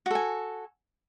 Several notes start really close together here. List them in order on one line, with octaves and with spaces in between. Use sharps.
F#4 A4 G#5